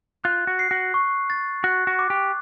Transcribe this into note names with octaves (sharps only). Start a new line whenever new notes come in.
F4 F#6
F#4
C7
F#4
C#6
A6
F#4 F#6
F#4
D6
G4